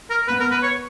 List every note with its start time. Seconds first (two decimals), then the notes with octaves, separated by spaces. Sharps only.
0.10 A#4
0.28 B3 B4
0.40 A#4
0.51 B4
0.63 C#5